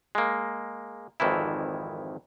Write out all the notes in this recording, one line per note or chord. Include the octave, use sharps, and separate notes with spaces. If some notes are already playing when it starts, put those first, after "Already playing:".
G#3 A#3
G#1 F2 D#3 E3 E4